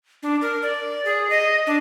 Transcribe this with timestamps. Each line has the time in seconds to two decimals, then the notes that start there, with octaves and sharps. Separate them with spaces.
0.23 D4
0.41 A#4
0.63 D5
1.05 G#4
1.30 D#5
1.67 D4